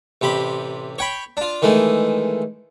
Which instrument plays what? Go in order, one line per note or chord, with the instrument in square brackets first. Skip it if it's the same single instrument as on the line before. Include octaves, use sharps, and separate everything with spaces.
[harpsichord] A1 C3 G4 B5
C#5 G5 B5
D4 F4
D#3 E3 G#3 A3